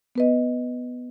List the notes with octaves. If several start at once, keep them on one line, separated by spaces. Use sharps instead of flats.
B3 B4 D#5